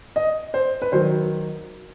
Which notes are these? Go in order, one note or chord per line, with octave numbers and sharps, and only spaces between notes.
D#5
C5
B4
D#3 F#3 C5